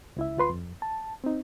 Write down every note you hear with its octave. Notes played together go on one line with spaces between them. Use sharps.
C#2 E4 E5
D2 F4 B4 C6
F2
A5
C4 D#4